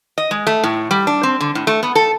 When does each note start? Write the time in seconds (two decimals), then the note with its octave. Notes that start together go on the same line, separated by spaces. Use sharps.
0.18 D#5
0.31 G#3
0.47 A3
0.63 A2
0.91 G3
1.07 D4
1.23 C4
1.41 D3
1.55 A2
1.67 A3
1.83 B3
1.95 A4